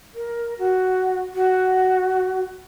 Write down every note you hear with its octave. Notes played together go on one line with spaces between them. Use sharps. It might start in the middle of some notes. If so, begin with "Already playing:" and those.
A#4
F#4
F#4